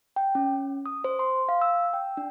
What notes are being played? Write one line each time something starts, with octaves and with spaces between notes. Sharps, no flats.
G5
C#4
D#6
C5
C6
F5
E6
G5
D4